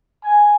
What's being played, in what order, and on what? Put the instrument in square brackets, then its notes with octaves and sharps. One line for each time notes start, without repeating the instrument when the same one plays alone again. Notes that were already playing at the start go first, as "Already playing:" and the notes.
[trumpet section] G#5